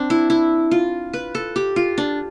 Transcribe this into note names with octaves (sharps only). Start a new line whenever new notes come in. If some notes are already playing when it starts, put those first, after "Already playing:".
Already playing: C4 D4
E4
E4
F4
B4
A4
G4
F4
D4